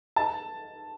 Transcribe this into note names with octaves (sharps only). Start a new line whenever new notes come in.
A5